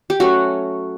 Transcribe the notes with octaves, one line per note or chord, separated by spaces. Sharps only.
G4
F#3 A3 C#4 F#4